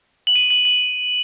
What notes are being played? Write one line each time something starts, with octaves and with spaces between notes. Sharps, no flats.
F#7
D#7
F#7
F#7